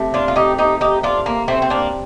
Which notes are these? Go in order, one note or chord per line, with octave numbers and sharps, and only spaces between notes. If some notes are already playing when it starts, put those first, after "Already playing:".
Already playing: C3 A3
D4 F4
F4
D#4 G4
D#4 G4
D#4 G4
D4 F4
A#3
A3 C4
C4
A#3 D4